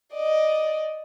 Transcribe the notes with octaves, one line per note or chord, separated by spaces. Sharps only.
D5 D#5